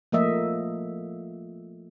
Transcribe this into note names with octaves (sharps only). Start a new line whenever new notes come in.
F3 A3 A#3 D#5 E5